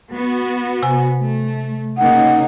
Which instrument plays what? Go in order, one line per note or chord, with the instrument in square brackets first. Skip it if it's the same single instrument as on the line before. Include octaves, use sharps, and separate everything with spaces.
[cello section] B3 F#4
[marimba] C3 G#5
[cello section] A3
[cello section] C#3 A#3 D#4 [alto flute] F#5